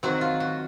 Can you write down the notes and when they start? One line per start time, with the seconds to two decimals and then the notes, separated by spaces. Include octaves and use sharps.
0.03 D#3 F#3 C4 F#4
0.21 F4
0.40 F#4